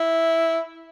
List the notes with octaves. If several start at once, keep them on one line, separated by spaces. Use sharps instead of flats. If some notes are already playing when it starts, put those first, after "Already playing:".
Already playing: E4